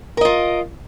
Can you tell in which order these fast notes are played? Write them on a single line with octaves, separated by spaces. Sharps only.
A#4 D#5 F4